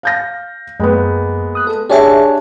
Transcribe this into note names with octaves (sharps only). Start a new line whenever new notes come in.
F5 G6 A#6
F#2 G#3 A#3 B3
D#6 F#6
A4
D4 G4 G#4 C#5 E5 G#5